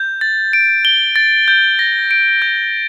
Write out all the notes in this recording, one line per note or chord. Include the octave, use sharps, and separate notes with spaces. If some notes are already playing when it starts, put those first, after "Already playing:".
Already playing: G6
A6
D7
G7
A6
G6
A#6
D7
G6